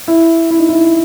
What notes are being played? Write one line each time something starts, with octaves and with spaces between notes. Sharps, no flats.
E4
E4
D#4
E4